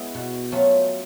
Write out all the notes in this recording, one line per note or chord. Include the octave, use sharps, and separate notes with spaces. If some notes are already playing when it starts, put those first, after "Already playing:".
Already playing: G#3 B3 E4 G#4
B2
F#3 A3 C#4 F4